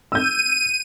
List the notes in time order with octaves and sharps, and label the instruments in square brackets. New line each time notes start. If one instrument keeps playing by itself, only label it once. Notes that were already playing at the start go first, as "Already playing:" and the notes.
[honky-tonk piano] E6 G6 [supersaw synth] D#7